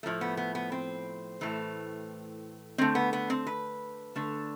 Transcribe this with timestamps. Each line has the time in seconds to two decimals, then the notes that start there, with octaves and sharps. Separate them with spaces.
0.03 A2 F3 A3
0.21 B3
0.37 B3
0.55 B3
0.72 C4
1.41 A2 E3 A3
2.78 D3 A3 C4
2.95 B3
3.13 B3
3.30 C4
3.47 B4
4.16 D3 A3